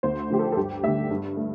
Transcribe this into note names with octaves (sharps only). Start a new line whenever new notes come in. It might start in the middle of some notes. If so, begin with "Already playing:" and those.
D2 C5
D3 F3 A3 G4
A4
A4
G2 G4
D3 A3 E5
G2
A3